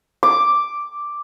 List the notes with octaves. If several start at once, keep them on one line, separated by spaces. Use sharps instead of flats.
D6